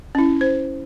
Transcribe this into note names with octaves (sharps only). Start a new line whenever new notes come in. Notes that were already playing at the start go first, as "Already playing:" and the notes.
C#4 E4
C5